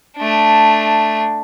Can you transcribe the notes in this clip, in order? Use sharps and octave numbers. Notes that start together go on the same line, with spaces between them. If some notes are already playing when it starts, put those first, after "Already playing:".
A3 D4